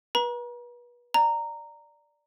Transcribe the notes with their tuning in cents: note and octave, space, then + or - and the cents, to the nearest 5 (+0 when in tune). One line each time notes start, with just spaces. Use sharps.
B4 -35 A#5 +35
D5 +0 A#5 -10